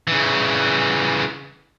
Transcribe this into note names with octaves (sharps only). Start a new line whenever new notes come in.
C#3 E3